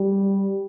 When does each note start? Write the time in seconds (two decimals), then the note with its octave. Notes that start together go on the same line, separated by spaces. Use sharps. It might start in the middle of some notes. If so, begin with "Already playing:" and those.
Already playing: G3